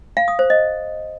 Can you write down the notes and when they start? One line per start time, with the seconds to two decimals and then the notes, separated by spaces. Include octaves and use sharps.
0.17 F5
0.28 D#6
0.39 C5
0.50 D#5